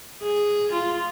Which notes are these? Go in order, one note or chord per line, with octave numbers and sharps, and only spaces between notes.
G#4
F4